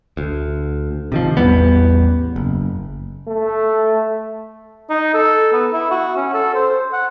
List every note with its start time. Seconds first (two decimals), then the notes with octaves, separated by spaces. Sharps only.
0.17 D2
1.12 C3 D#3 F3
1.37 A1 E2 G3 B3
2.36 F#1
3.27 A3
4.90 D#4
5.14 A4
5.53 B3
5.73 E4
5.91 F#4
6.16 C#4
6.34 A4
6.54 C5
6.93 F#5